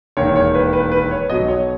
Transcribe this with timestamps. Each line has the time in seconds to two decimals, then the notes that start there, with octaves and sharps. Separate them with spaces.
0.17 E1 D#2 D#3 C#5
0.36 C#5
0.55 B4
0.73 B4
0.92 B4
1.11 C#5
1.30 B1 B2 F#3 D#5
1.48 C#5